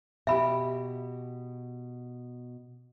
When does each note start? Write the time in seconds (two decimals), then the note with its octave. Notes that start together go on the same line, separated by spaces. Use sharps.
0.27 B2 G4 E5 B5